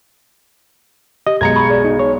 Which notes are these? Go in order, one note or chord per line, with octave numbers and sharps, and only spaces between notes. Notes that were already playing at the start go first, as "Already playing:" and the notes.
G4 D#5
B1 G#3 A#5 G#6 C#7
B5 C#6
G#4 D5
D#4
C#5